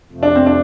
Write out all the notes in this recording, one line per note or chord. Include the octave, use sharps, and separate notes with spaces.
F2 C3 F3 A3
D4
C4
D4